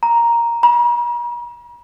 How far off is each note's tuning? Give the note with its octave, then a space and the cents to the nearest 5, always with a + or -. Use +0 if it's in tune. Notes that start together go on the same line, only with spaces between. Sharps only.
A#5 +5
A#5 +45